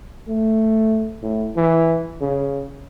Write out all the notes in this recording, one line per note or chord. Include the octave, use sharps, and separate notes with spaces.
A3
A2
E3
C#3